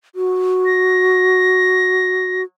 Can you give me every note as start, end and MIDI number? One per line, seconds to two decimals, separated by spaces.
0.15 2.44 66
0.66 2.42 94